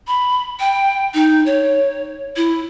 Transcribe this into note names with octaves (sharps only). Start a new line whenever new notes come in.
B5
G5
D#4
C#5
E4